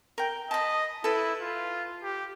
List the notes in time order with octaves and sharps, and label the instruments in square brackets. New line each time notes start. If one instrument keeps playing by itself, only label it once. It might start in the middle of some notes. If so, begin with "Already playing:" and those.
[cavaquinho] A#4 G5
[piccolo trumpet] D#5 [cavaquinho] A5 B5
[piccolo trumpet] E4 [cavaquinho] A4 B4
[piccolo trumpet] F4
G4